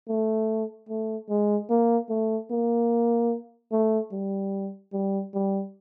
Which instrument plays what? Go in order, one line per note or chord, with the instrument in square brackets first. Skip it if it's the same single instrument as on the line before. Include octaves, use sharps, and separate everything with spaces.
[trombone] A3
A3
G#3
A#3
A3
A#3
A3
G3
G3
G3